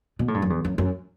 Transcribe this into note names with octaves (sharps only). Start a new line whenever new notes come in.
B2
A2
G2
F#2
E2
F#2
F#2